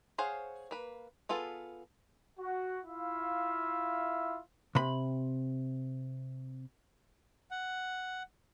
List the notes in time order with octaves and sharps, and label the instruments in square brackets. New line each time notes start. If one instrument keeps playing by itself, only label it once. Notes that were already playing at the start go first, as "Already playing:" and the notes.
[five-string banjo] G#4 C5 C#5 F5 F#5
A#3 B4
B3 F4 G#4 A4
[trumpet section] F#4
E4 F4 E5 F5
[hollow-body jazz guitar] C3 B5
[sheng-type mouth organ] F#5